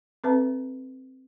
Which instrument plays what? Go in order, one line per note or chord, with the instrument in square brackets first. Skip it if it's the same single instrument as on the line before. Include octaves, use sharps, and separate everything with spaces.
[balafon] C4 A4 B4 E5 A5